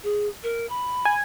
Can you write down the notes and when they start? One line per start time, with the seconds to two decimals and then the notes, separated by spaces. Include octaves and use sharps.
0.03 G#4
0.43 A#4
0.69 B5
1.05 G#5